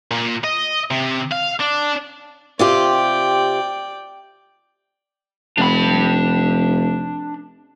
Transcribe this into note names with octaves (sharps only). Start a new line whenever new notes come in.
A#2
D#5
C3
F5
D4
C3 F4 G4 D5 G5
F1 D4 B5